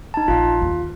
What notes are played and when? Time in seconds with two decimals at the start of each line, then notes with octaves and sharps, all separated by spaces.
0.14 D#4 A5
0.28 A#1 F4 F5
0.62 D#2